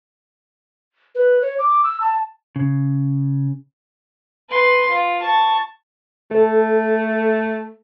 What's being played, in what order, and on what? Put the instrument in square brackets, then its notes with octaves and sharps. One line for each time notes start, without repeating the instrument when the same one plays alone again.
[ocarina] B4
C#5
D6
E6
A5
[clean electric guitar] C#3
[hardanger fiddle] B4 C6
F4
A5 C#6
[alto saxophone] A3 [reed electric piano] A4